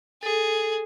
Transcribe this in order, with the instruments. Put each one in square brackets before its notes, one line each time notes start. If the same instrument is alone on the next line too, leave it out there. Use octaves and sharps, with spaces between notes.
[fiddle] G#4 [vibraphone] A4